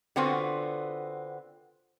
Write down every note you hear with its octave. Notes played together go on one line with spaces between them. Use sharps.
D3 B3 C4 F4 F#4